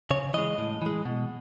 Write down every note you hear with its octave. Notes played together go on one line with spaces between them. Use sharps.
C#3 C#5
E3 G#3 D#5
A2
E3 G#3
B2